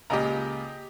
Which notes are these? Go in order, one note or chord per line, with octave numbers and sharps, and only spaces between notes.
C#2 A#2 G4 D#5 A#5